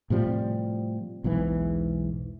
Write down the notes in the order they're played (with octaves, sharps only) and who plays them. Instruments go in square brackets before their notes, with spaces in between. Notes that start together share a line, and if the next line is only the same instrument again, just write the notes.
[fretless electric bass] A2 C3 F3 G3
B1 E2 G#2 E3